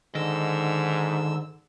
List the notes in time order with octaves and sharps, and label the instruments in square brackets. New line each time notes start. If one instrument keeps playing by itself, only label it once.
[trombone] G#2 [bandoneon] D3 E6 [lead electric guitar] D#3 D#5